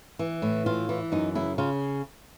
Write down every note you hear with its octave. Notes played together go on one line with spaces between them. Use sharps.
E3
A2
E3 F4
E3
F#2 D#4
C#3 E4
C#3 F4